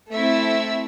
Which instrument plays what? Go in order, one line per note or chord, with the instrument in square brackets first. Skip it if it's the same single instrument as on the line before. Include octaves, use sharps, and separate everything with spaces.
[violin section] A3 C4 E4 E5